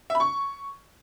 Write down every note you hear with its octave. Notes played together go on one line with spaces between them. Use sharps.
E5
B5
C#6